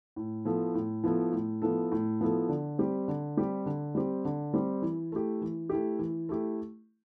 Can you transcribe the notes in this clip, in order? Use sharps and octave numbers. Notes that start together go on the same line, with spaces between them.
A2
F3 B3 E4 A4
A2
F3 B3 E4 A4
A2
F3 B3 E4 A4
A2
F3 B3 E4 A4
D3
G3 C4 G4
D3
G3 C4 G4
D3
G3 C4 G4
D3
G3 C4 G4
E3
A3 E4 G4
E3
A3 E4 G4
E3
A3 E4 G4